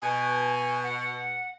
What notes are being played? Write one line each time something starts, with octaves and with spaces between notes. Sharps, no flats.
B2 G#5
F#5